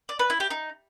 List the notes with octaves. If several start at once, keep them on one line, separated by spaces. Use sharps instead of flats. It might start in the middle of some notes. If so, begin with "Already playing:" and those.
D5
B4
E4
G4
D#4